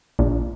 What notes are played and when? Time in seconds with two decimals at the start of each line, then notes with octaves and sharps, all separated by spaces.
0.19 A#1